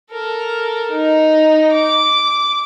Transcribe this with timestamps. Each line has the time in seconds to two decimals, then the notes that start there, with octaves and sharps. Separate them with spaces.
0.11 A4 A#4
0.91 D#4
1.73 D6